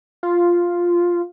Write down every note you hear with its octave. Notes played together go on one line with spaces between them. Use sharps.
F4